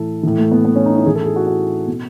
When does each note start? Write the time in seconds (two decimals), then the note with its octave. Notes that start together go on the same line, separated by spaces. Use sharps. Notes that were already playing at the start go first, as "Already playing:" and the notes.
Already playing: A2 E3 A4
0.23 A2 E3
0.38 A3
0.52 B3
0.65 B3
0.76 C#4
0.86 D#4
0.95 E4
1.06 A2 E3 G#4
1.16 A4
1.26 G#4
1.36 F#4
1.47 F#4
1.87 B2